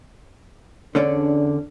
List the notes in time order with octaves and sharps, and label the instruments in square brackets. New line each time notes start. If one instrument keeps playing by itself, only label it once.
[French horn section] E2 D4 [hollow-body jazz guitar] D3 C#4 D5